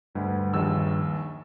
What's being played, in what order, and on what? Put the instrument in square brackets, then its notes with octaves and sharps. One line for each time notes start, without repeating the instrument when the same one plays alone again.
[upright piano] D2 [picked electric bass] G2
[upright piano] A#1 D#2 E6